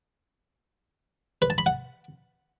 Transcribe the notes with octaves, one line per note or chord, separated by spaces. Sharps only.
B4
A5
B5
F#5